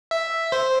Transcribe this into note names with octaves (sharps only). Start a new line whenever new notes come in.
E5
C5